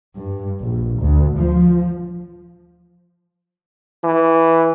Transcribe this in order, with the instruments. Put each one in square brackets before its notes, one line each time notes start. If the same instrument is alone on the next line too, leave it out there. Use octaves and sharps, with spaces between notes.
[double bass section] G2
A#1
D2
F3
[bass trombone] E3